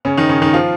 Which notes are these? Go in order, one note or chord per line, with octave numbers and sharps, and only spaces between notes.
C#3 C#4
D#3 D#4
C#3 C#4
D#3 D#4
F3 F4